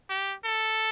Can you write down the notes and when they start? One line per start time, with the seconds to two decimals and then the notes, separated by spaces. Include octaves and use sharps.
0.10 G4
0.44 A4